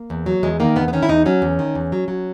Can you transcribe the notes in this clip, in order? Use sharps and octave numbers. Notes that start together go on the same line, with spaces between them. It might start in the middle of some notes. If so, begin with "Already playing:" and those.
Already playing: A#3
E2
F#3
E2 G#3
D#3 A#3
E2 B3
B3
D#3 C#4
E4
E2 D#4
F#3 C#4
E2
D#3
E2
F#3
F#3